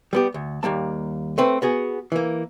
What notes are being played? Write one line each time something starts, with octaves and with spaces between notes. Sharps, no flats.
G3 B3 G4
D2
D#2 G3 A#3 A5
A3 C4 B4
B3 F#4 G#4
E3 A#3